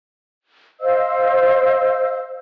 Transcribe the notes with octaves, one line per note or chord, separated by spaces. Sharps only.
C5 D#5 F5 E6